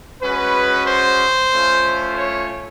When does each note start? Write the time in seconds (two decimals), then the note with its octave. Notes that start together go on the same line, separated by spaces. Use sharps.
0.22 G#3 C#4 F#4 B4
0.86 C5
1.51 A3 C#4 F4
2.17 C#5